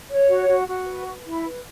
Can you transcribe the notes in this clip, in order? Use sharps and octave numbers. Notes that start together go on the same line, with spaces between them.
C#5
F#4
F#4
F#4
B4
B4
E4
B4